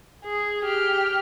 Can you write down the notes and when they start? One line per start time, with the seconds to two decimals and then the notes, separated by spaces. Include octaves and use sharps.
0.24 G#4
0.65 G4 F6